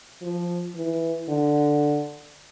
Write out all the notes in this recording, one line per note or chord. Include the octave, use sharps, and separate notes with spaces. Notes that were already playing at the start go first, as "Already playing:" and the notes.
F3
E3
D3